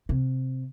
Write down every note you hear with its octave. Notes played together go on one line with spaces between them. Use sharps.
C3